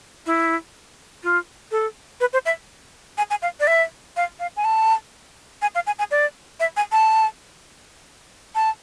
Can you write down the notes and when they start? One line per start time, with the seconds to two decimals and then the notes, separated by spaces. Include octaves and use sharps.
0.26 E4
1.23 F4
1.71 A4
2.20 B4
2.33 C5
2.45 E5
3.18 G#5
3.30 G#5
3.42 F5
3.60 D5
3.67 E5
4.17 F5
4.40 F5
4.57 G#5
4.65 A5
5.62 G#5
5.75 F5
5.87 G#5
5.99 G#5
6.11 D5
6.60 E5
6.77 G#5
6.92 A5
8.55 A5